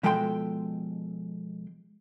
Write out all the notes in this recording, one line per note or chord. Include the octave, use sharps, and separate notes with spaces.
B2 F3 G#3 A4 G5 C6